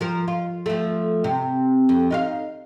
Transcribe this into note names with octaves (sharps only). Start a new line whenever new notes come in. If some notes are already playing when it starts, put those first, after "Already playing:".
F3 A#4
F4
F3 A3
C3
F2
D#4 F4 F5